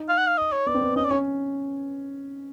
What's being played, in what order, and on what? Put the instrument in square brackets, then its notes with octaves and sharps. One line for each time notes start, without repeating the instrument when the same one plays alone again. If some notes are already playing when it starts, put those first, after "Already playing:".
Already playing: [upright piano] D#4
[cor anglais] F5
F#5
F5
D#5
C#5
[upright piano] B3 [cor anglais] D5
[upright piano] C4
B3
[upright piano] C#4 [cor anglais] D#5
[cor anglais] D5
[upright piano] C#4 [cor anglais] C#5